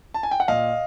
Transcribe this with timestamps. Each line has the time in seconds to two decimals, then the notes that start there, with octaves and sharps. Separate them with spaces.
0.14 A5
0.23 G#5
0.31 G5
0.40 F#5
0.48 A#2 D#5 F5